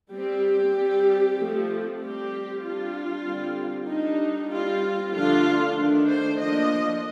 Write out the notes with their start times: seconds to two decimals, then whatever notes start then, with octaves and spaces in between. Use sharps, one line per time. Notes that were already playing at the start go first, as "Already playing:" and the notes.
0.11 G3 C4 G4
0.74 G3 C4
1.37 F3 A3 C4
2.00 G3 C4 G4
2.62 G3 D4 F4
3.25 D3 G3 C4
3.88 G3 D4 D#4
4.51 G3 C4 F4
5.13 D3 F3 A3 D4 F4
5.76 D#3 A3 D4
6.07 C5
6.39 F3 A#3 D4 D#5